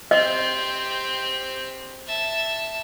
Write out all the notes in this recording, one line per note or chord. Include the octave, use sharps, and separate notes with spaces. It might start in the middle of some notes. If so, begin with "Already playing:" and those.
C4 G4 D#5
E5 A5